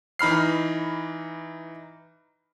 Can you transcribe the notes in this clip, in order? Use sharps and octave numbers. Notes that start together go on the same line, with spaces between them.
E3 D#4 B5 F6 C7